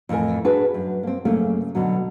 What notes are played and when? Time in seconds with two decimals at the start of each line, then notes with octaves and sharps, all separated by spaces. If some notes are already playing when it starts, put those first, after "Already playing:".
0.09 F2 A2 E3 A#4 G#5
0.45 D4 F#4 G#4 B4
0.74 F#2
1.03 A#3 C4
1.25 F#2 C#3 A3 A#3 C#4
1.75 B2 D3 F#3